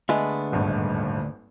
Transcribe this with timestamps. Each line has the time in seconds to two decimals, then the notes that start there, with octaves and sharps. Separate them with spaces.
0.09 D2 G#3 A3 B3 D4 B4
0.52 D#1 G#1 G2